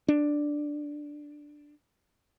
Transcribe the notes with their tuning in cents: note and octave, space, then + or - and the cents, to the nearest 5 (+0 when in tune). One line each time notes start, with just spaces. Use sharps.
D4 +5